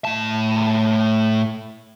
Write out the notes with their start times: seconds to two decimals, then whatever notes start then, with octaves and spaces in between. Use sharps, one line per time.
0.05 A2 A5